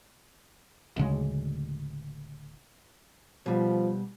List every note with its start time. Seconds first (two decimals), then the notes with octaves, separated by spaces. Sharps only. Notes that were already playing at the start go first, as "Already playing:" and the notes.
0.96 D1 D2 C#3 G#3
3.46 B2 F3 G3